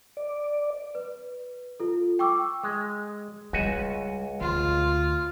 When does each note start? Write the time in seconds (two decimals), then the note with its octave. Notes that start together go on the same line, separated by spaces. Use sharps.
0.17 D5
0.95 B4
1.80 F4 A4
2.19 G5 C#6 D6 E6
2.63 G#3
3.53 C#2 G3 F#4 G#5
4.41 D2 F4